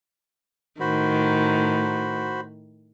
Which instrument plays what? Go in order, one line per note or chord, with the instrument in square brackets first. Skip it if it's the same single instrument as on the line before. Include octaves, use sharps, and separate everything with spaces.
[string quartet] A2 D#3 [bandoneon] F#4 C5 B5